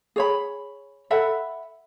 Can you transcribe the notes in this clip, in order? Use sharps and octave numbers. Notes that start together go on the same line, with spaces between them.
G#4 C#5 B5
A4 E5 F#5 B5